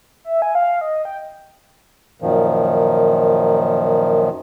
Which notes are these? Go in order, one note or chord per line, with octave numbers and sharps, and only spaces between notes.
E5
G#5
F5
D#5
G5
F#2 A#2 D#3 F3